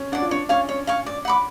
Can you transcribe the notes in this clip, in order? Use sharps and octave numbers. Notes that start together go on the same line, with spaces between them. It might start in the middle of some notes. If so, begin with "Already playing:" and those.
Already playing: C#4
D4 D5 F#5
F4
D4 C#5
C#4 F5 G#5 C#6
C#4 C#5
F5 G#5 C#6
D5
F#5 B5 D6